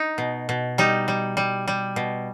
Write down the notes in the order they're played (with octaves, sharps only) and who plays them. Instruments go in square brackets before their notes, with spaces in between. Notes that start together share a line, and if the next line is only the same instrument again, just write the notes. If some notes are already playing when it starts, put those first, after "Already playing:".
Already playing: [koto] D#4
B2
B2
G3 D#4
G3
G3
G3
B2